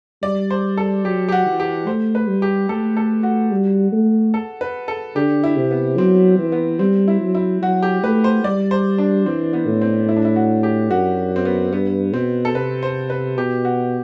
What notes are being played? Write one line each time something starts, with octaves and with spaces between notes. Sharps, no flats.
G3 D5
C5
A4
F#3 G4
G4
F#4
E3
G4
A3 C5
B4
G3
G4
A3 A4
A4
F#4
G3
A3
A4
B4
A4
D3 G4
E4
C3
B3
F#3 C4
E3
B3
G3 C4
E4
F#3
E4
F#3 F#4
G4
A3 B4
C5
G3 D5
C5
D4
E3 C4
B3
A2
C4
E4
D4
E4
F#4
G4
F#2 F#4
C4
B3
G2 B3
B2 C4
A4
C3 B4
C5
B4
B2 G4
F#4